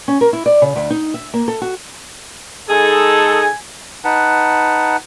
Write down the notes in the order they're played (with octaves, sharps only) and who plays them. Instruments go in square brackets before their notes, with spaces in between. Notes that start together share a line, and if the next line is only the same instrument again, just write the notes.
[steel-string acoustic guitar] C#4
A#4
E4
D5
C#3
D2
D#4
E5
A#3
A4
F#4
[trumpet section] G#3 D#4 A4 [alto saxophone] G#4 [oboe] G#5
[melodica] D#4 B4 F#5 A5